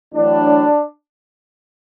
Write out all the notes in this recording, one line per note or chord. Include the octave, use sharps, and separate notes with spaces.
A1 A2 F#3 D4